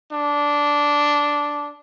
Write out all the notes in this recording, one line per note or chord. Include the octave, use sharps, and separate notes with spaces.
D4